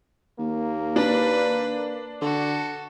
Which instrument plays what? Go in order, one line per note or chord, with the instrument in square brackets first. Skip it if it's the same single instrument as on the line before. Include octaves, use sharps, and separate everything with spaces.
[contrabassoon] D#2 [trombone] A#3
[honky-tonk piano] D4 [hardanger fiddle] B4
[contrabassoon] D3 [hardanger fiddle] F#4 A4